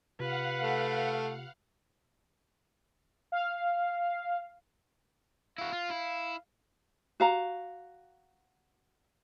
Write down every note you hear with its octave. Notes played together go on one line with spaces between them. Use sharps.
C3 F4 G4 B4 F5 F#5
A3
F5
E4 F#4 F5
F4
E4
F#4 F5 A#5